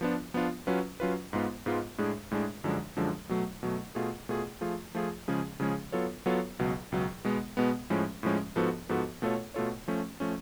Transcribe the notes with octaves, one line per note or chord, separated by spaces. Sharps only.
F3 B3 D4 F4
F3 B3 D4 F4
F#3 C#4 F4 B4
F#3 C#4 F4 B4
G#2 G#3 B3 F4
G#2 G#3 B3 F4
A2 G#3 D4 G#4
A2 G#3 D4 G#4
F#2 D3 F3 G#3 D4
F#2 D3 F3 G#3 D4
B2 F#3 A3
B2 F#3 A3
B2 A3 F4 G#4
B2 A3 F4 G#4
F3 A3 F4 G#4
F3 A3 F4 G#4
C#3 F3 G#3 C#4 G#4
C#3 F3 G#3 C#4 G#4
F#3 B3 F4 A4 C#5
F#3 B3 F4 A4 C#5
C#2 B2 F#3
C#2 B2 F#3
B2 G#3 B3
B2 G#3 B3
A2 F3 G#3 C#4
A2 F3 G#3 C#4
G#2 F3 B3 F#4 A4
G#2 F3 B3 F#4 A4
B2 A3 F4 A4 C#5
B2 A3 F4 A4 C#5
F3 A3 C#4
F3 A3 C#4